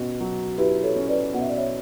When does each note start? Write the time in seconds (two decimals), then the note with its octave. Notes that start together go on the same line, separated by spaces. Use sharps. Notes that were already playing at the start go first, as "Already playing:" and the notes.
Already playing: B2 C#4
0.20 F#3
0.58 E4 G4 B4
0.83 A4 C#5
0.96 C#4
1.08 B4 D5
1.34 B2 F#5
1.41 E5
1.49 D5
1.57 C#5 E5